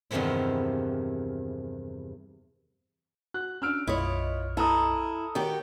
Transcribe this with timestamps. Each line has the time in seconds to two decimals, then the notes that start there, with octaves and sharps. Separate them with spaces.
0.11 E2 G2 C3 D#3 F3 E4
3.34 F#4 F#6
3.62 C#4 D4 E6 F6 D7
3.87 B1 F#2 E4 F4 C#5 D#5
4.57 E4 A4 A#5 D#6
5.35 D#3 F#4 G4 C#5